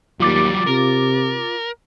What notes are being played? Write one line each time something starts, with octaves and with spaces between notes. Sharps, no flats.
D#2 F#3 G3 F4 D6 A6
C3 A#4